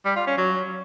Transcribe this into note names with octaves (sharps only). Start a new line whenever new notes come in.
G3
F4
C#4
F#3